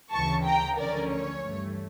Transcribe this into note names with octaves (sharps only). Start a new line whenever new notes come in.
D2 C#3 E3 A5 C#6
G5 A#5
D2 D3 F3 C#4 A#4 D5
C#5
G2 E3 A3